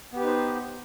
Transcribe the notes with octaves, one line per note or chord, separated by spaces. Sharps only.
B3 D#4 G4 B4 C5